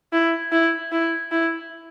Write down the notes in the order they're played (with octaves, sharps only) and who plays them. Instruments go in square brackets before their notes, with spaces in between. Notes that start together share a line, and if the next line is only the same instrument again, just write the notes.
[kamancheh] E4
E4
E4
E4